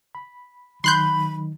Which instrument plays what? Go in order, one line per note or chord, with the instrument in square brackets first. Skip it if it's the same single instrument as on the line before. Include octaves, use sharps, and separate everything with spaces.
[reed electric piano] B5
[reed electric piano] D#3 F#3 D#4 [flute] B5 [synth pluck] C6 F#6 G6